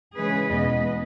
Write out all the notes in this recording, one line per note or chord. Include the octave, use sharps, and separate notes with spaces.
C#3 E3 G#3 C#4 G#4 B4
E2 B2 G#3 B3 B4 D#5